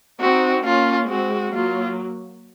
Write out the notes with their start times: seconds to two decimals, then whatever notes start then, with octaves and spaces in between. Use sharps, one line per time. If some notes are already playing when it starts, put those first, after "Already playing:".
0.20 C4 D#4 F#4
0.64 A#3 C#4 F4
1.08 G#3 C4 F#4
1.53 F#3 A#3 F4